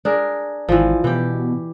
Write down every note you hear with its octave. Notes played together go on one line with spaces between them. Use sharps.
D4 G#4 A#4
G#1 E3 F3
B2 E3 G4